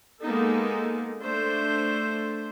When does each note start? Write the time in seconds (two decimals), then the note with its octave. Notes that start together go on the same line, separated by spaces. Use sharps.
0.22 G#3 A#3 B3 D#4 A4
1.22 A3 D4 C5